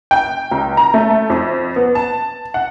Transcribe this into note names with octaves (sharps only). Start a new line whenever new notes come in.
G5
C#2
A#5
A3
F2
B3
A5
F#5